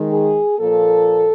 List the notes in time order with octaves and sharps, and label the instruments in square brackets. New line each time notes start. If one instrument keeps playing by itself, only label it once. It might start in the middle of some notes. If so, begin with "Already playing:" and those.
Already playing: [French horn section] D#3 G#3
G#4
A#2 F3 A#3 A4